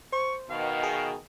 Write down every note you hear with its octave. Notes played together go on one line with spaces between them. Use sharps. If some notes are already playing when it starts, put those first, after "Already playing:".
C5 C#6
B2 D#3 F5
G#4